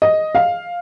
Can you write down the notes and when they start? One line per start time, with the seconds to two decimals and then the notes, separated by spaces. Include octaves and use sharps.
0.02 D#5
0.35 F5